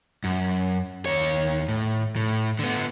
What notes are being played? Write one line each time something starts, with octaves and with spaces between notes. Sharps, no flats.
F#2
D#2 C#5
A2
A2
D3 B3